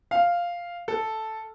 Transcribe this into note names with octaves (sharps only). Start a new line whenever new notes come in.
F5
A4